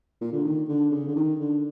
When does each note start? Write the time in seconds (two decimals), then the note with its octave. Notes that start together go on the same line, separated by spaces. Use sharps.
0.21 A#2
0.32 D3
0.45 D#3
0.68 D3
0.91 C#3
1.08 D3
1.16 D#3
1.40 D3